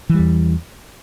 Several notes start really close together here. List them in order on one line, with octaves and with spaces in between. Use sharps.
E3 G3 E2